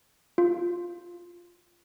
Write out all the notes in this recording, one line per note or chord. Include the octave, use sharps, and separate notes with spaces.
F4